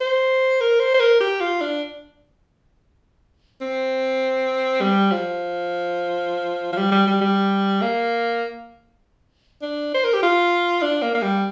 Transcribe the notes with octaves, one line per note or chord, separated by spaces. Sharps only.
C5
A#4
C5
C5
A#4
G4
F4
D4
C4
G3
F3
F3
G3
G3
G3
G3
A#3
D4
C5
A#4
G4
F4
D4
A#3
A#3
G3